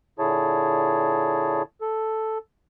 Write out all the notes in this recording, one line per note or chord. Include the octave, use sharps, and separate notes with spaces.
A#2 D3 E4 G#4 C#5 A5
A4